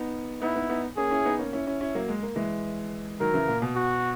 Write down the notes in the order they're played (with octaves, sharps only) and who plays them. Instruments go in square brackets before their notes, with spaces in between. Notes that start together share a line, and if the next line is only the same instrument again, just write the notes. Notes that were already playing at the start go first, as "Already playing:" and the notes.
Already playing: [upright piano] B3 D#4
[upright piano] B3 D#4 [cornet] E4
[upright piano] B3 D#4
B3 D#4
[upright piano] A#3 C#4 [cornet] G#4
[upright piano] C#4 E4
B3 D#4
A#3 C#4
C#4 E4
C#4 E4
C#4 E4
F#3 A#3
G#3
A#3
E3 G#3
[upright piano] D#3 F#3 [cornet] A#4
[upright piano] C#3 E3
A#2
B2
[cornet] F#4